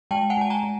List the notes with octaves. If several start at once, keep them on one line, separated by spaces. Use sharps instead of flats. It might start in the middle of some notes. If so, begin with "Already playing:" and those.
G#3 G5 A5
F#5 G#5
G#3 A5
G#5 A#5
G#3